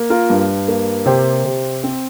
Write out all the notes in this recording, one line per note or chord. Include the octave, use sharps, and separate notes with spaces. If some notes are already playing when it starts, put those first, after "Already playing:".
Already playing: A#3
F4 A#4
G2
A#3
C3 G4 C5
C3
C4